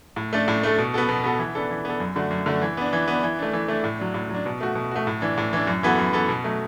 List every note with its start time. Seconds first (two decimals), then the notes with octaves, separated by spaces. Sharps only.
0.16 A2
0.33 A3 D4 A4
0.48 A2
0.63 A3 D4 A4
0.78 B2
0.94 B3 F#4 A4
1.09 B2
1.23 B3 F#4 A4
1.39 E3
1.55 B3 D4 A4
1.70 E3
1.85 B3 D4 A4
2.00 F#2
2.16 D3 A3 D4 F#4
2.30 F#2
2.46 D3 A3 D4 F#4
2.62 E3
2.77 B3 D4
2.93 E3
3.08 B3 D4
3.23 E3
3.39 A3 D4
3.53 E3
3.68 A3 D4
3.84 A2
3.99 F#3 D4
4.14 A2
4.29 F#3
4.34 D4
4.46 B2
4.61 A3 F#4
4.75 B2
4.91 A3 F#4
5.07 A2
5.21 E3 D4
5.38 A2
5.53 E3 D4
5.67 F#2
5.83 E3 B3 F#4 A4
5.98 F#2
6.13 E3 B3 F#4 A4
6.29 B2
6.44 F#3 A3